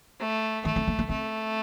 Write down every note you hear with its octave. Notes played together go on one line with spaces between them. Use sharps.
A3
D#3 A3
C4
A#3
A#3
A3 C4